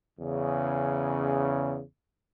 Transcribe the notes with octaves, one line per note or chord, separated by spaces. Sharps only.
E2 C#3